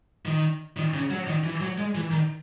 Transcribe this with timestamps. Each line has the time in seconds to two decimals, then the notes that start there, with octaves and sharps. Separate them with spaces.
0.25 D#3
0.77 D#3
0.94 C#3
1.10 F#3
1.27 D#3
1.44 E3
1.60 F#3
1.78 G#3
1.95 E3
2.11 D#3